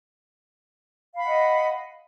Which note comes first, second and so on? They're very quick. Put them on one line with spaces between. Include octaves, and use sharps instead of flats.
F5 B5 F#5 D#5